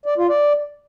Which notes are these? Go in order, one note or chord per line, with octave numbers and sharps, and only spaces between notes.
D5
F4
D5